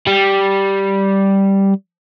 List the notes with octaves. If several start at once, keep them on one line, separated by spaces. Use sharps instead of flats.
G3